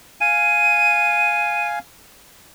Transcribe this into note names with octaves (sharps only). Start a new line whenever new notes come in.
F5 G#5 D#7